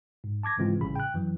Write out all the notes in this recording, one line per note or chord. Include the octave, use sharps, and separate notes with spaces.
G#2
A5 D6 G#6 A#6
G#2 C#3 E3 G#3 C4 F4
A1 A2 C#3 G3 B5
G5 F#6
F#2 E3 F#3